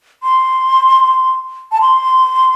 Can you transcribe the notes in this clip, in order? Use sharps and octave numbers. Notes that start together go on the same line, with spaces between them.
C6
A5
C6